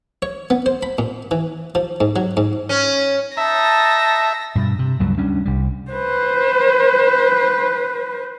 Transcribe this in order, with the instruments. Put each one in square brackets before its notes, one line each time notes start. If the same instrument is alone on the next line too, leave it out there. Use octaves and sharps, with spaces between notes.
[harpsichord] C#5
B3
C5
B5
A#2
E3
F3
G#2
F#3
G#2
[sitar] C#4
[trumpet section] D#4 A5 [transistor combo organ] E5 [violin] A#6
[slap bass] G2 B2
C3
C#2 G2 F#3 G3
D2 G3 C#4 D4
C2 G3
[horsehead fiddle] B4 C5